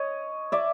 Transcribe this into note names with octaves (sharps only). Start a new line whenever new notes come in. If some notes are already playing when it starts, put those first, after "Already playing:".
Already playing: C#5 D#5
D5 E5